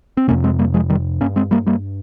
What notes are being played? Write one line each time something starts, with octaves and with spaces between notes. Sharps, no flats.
C4
F2 C3 A#3 C#4
G#3 C4
G3 A#3
F3 G#3
D#3 G3
G2 A#3 C#4
G#3 C4
G3 A#3
G3 A#3